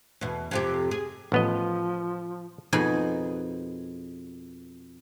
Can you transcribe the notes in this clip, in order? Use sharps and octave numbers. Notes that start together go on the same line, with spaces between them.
E2 B2
F2 C3 G4
G#4
A1 F3 B3 D#5
F2 B2 D#4 G#4 B5